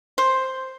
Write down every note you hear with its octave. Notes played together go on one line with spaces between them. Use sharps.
C5